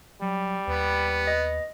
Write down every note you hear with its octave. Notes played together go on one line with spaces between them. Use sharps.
F#3 G3
D#2 B3
D#5